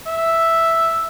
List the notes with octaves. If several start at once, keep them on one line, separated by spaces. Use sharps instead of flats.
E5